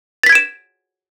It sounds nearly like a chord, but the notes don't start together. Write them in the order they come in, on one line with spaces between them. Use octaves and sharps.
A6 B6 G#6 D7 E7